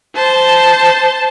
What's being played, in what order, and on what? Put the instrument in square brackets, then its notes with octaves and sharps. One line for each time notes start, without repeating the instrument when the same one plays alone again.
[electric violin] C5 [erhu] A5